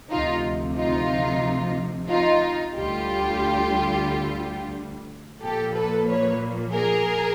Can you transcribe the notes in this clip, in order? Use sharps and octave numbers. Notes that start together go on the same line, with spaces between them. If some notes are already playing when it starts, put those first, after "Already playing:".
D2 C3 F3 D#4 F4
D#4 F4
D#4 F4
D2 D3 G3 F4 G4
A#2 F3 A#3 G4 A4
A4 B4
B4 C#5
G#4 A#4